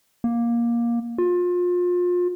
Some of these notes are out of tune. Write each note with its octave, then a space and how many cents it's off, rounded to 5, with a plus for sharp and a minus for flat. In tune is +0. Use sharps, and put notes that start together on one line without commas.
A#3 +15
F4 +30